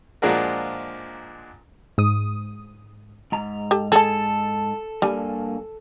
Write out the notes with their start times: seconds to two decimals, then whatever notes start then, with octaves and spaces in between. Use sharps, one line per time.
0.22 A#2 F3 G#3 D4 F#4 A#4
1.98 G#2 D#6
3.32 G#2 A#5
3.71 G4 A4
3.92 G#4 A4 A5
5.02 G2 G3 A#3 G#5